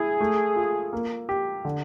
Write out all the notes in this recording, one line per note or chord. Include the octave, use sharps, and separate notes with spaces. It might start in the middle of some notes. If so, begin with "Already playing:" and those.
Already playing: E4 G#4
A3
F4
A#3
G4
D3